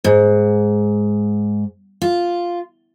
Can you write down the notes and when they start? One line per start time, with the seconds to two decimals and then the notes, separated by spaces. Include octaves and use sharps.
0.04 G#2
2.02 F4